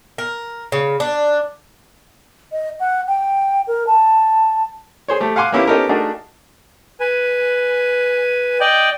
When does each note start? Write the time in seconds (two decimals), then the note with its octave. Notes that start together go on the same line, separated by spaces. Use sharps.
0.18 A#4
0.72 C#3
1.00 D4
2.52 D#5
2.80 F#5
3.07 G5
3.67 A#4
3.87 A5
5.08 G#4 C5 C#5
5.20 A3 G4
5.36 F5 F#5 G#5 C6 D6
5.52 A#3 B3 C#4 E4 G4
5.67 B3 C#4 D#4 G4 A4 A#4
5.89 A3 D4 D#4 F#4 G#4 A#4
7.00 B4 G#5
8.60 D5 D#5 G5